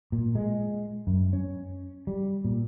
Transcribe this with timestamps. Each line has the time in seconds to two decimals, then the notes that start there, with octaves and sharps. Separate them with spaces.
0.12 A#2
0.35 G#3
1.07 F#2
1.33 C#4
2.07 G3
2.45 A#2